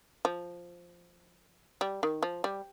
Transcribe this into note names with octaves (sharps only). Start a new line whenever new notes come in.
F3
G3
D#3
F3
G3